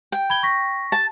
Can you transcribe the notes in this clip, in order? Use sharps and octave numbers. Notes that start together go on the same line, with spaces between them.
G5
B5 G#6 G7
C#6 A#6 B6
A5